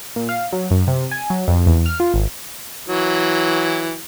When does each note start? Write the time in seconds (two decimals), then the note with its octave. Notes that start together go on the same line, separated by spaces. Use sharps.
0.16 A#2
0.29 F5
0.52 F#3
0.71 F#2
0.87 C3
1.11 G#5
1.30 F#3
1.48 F2
1.66 E2
1.86 F6
2.00 F4
2.14 G#1
2.88 E3 F#3